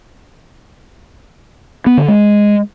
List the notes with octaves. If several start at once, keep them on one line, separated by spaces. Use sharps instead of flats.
B3
D3
G#3